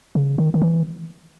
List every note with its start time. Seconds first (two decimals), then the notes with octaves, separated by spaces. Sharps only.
0.15 C#3
0.38 D#3
0.54 D#3
0.62 E3